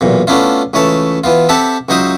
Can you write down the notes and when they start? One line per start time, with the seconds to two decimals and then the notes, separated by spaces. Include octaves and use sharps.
0.01 B1 E2 A#2
0.27 A3 B3 C#4 D4 E4 F4
0.74 C#2 E3 A3 C#5 E5 A5
1.24 E3 B3 F4
1.49 C4 G4 A4 E5 F#5 A5
1.89 C#2 F#3 D#4 C5 E5 D#6